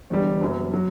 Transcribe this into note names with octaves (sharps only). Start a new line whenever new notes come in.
E1 E2 D3 G3
F#1 F#2 F#3 B3
F#3